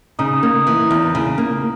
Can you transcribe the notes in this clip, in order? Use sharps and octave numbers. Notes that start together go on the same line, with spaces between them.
C#3 D#4
A#3
E3
E2
C#3
A#3